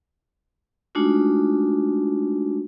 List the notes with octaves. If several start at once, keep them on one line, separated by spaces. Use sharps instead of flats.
G#3 A3 D4 D#4 F4 F#4